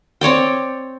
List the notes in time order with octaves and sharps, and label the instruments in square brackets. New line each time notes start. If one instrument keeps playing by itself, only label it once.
[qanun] C4 C#5 D5 G5